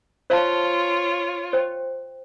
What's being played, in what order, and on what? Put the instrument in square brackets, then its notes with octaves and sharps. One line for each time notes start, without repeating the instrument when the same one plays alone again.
[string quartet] F4 C#5 [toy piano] C5 F5 A5
[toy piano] C5 G5